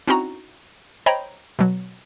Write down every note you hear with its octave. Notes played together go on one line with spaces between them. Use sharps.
C4 C#4 D#4 E4 F#4 A#5
C5 C#5 D#5 G5 A#5 B5
B2 F#3